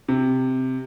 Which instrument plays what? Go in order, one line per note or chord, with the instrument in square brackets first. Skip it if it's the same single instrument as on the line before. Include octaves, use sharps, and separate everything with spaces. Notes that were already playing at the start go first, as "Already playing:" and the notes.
[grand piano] C3